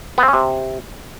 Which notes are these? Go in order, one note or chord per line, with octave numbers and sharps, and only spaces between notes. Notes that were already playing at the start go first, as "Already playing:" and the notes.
B3
C4
C#4
C3